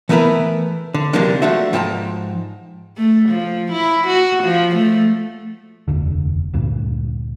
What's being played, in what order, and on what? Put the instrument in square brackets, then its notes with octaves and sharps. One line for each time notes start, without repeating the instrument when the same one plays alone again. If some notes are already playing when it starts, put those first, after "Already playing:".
[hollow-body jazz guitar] E3 A3 B3 E4 A#4 B4
D3
D#2 C3 E3 F#3 A#3 D4
F3 A3 D4 F#4 E5
G#2 F3 G5 A5 A#5
[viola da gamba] A3
F3
E4
F#4
F3
A3
[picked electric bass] F1 D#2 D3
D2 G2 A#2